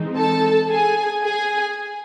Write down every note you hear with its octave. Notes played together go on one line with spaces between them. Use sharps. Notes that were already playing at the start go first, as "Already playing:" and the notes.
Already playing: E3 G#3 C4 D#4
A4 A5
G#4 G#5
G#4 G#5